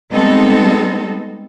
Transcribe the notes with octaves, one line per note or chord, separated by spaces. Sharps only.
G3 G#3 B3 C4 D#4 A4